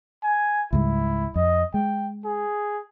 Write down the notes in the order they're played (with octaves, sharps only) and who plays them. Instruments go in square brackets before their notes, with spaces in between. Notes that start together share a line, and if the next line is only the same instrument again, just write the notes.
[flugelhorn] G#5
[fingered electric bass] C#2 G#2 G3 [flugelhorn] E4
[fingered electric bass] F2 [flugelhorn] D#5
[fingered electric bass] G#3 [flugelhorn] G5
[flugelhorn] G#4